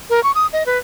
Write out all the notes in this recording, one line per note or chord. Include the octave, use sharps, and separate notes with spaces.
A#4
C#6
D#6
D#5
B4